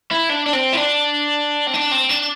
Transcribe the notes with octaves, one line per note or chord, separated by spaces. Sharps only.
E4
D4
D4
C4
E4
D4
C4
D4
C4
D4